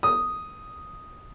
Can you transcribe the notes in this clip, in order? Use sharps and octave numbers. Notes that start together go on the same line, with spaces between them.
D#6